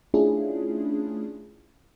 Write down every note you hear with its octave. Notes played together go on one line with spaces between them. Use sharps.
A3 C#4 D4 E4 F4 G#4